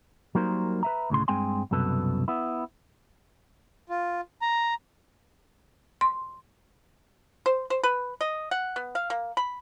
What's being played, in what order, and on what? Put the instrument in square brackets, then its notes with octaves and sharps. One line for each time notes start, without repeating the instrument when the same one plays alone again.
[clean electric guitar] F#3 G3 A#3 D#4 A#4 C5
B4 E5 A#5
D2 A2 C#3 C6
G2 G#3 C4 G5 G#5 C6
C2 F#2 B2 A4 B4
B3 E4
[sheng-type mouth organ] F4
A#5
[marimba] C6
[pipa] C5
C5
B4
D#5
F#5
B3
F5
A#3
B5